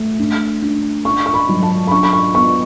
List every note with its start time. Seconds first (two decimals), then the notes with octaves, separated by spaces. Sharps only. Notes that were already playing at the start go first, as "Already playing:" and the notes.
Already playing: A3
0.19 D4
0.62 D4
1.05 D4 C#6
1.26 C#6
1.34 B5
1.49 F#3
1.63 A5
1.87 B5
1.91 D4 C#6
2.03 B5
2.13 C#6
2.35 B3 C#6